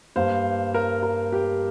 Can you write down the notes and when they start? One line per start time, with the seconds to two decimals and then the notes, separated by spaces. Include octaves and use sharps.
0.16 G2 G3 A#3 C5 F5
0.74 A#4
1.03 A#4
1.32 G4